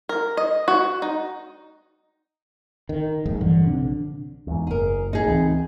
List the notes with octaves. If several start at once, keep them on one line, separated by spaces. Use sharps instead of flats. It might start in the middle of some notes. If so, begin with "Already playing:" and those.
A#4
D#5
F#4
D#4
D#3
A#1 G#2
G2 D3 E3
A#1 C3 D4
E2 G#2
F#1 G#4 A#4
D#4 G#4
C#2 E3 C4